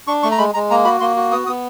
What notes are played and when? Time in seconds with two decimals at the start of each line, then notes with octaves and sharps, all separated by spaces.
0.07 D4 C#6
0.23 A3 C#6
0.31 A#5
0.38 G#3 B5
0.54 G#3 A#5
0.70 A#3 A#5
0.85 F#4 B5
1.00 A#3 C6
1.16 F#4
1.32 B3 D#6
1.46 B3 D#6